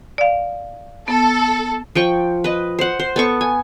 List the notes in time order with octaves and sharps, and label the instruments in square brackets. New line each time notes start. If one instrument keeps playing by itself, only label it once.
[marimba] D5 F5
[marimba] B3 [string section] A4
[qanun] F3 G5 C#6
B4 D#5
C5 F#5
C5
B3 A4 C#6
G#5